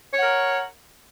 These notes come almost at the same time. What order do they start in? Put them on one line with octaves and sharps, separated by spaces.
C#5 F#5 A#4